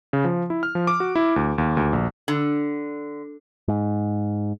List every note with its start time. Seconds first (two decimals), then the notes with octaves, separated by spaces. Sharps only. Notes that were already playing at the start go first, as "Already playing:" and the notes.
0.13 C#3
0.24 F3
0.50 E4
0.63 F6
0.75 F3
0.87 D6
1.00 F#4
1.15 E4
1.36 D2
1.58 D#2
1.77 D2
1.93 A#1
2.28 D3
3.68 G#2